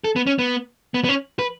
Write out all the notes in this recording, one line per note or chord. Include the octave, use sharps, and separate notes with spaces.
A4
B3
C#4
B3
B3
B3
C#4
B4